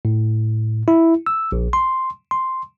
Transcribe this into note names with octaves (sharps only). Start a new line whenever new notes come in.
A2
E4
E6
A#1
C6
C6